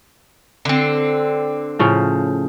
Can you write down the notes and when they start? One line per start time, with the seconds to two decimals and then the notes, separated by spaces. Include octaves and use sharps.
0.65 D3 C4
1.79 A2 C#3 F3